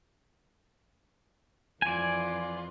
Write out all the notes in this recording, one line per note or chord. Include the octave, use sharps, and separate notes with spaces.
F2 E3 F4 D5 G#5